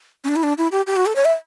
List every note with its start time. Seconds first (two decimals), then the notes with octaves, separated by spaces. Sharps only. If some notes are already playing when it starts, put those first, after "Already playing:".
0.24 C#4
0.28 D4
0.36 E4
0.43 D4
0.58 E4
0.72 G4
0.87 G4
0.96 F#4
1.06 A4
1.16 C#5
1.25 E5